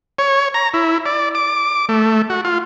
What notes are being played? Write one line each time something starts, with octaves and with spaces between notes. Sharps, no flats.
C#5
A#5
E4
D5
D6
A3
F#4
F4